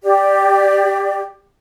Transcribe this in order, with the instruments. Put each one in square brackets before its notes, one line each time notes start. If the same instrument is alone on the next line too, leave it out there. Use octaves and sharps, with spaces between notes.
[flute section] G4 D5